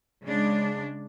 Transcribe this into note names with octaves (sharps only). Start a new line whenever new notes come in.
C#3 G#3 D4